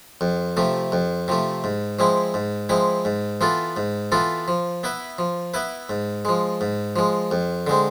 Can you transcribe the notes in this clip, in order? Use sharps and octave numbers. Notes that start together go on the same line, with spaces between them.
F2
C3 F3 A3
F2
C3 F3 A3
G#2
F3 G#3 C4 E4
G#2
F3 G#3 C4 E4
G#2
E3 B3 F4 A4
G#2
E3 B3 F4 A4
F3
B3 E4 B4 E5
F3
B3 E4 B4 E5
G#2
F3 G#3
G#2
F3 G#3
F2
D3 G#3 C4